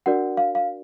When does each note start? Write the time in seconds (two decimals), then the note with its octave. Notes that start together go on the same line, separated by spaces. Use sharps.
0.06 D4 F#4 A#4 D5 F#5
0.37 F5
0.55 F5